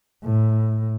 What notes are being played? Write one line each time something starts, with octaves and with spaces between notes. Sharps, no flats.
A2